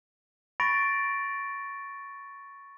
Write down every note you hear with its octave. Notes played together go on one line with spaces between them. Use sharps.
B5 C#6 A6 A#6 D7